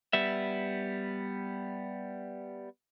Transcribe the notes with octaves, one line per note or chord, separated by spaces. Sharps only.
G3 B3 E5